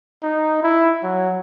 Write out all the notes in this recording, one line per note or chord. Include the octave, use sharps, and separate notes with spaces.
D#4
E4
F#3